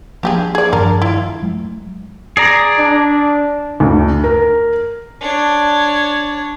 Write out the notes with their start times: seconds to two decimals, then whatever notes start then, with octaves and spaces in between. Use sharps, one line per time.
0.23 F3 A#3 D4 G4 G#4
0.55 G#4 D5
0.73 G2 D#3 F3 D4 A#4
1.02 E4 F4
1.43 F#3 G#3 A3
2.37 G#4 D5 A#5
2.78 D4
3.80 D2
4.24 A#4
5.21 D4 C#5